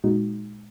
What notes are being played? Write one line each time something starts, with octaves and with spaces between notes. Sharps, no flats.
A#2 G#3 D#4 F#4